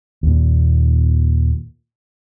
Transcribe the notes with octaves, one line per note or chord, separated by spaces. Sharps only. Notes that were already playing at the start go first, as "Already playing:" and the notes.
D#2 A#2